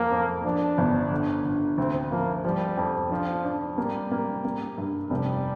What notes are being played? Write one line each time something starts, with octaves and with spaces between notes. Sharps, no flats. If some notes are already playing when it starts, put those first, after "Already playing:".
Already playing: F2 A#3
F2
F3 D4
G1
D3
D3
D2 C4
F3 A#3
F3 G3
F2
F3 D4
D4
G3 A#3
A#3
A#3
G2
F1 G3